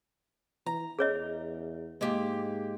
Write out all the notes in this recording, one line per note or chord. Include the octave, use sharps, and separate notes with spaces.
E3 A#5
E2 G#4 C#5 D#5
G#2 G#3 A#3 G4